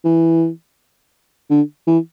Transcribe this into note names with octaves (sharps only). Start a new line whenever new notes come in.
E3
D3
E3